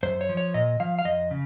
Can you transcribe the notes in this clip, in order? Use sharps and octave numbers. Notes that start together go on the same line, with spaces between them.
F#2 C5
C#5
F3
C#5
A#2 D#5
F3 F5
F5
F2 D#5
C#3